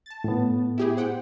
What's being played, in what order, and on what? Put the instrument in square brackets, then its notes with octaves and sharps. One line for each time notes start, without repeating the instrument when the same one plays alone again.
[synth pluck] A5 A6
[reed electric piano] A2 B3
[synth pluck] E4 G4 G#4
C5 F#5 G5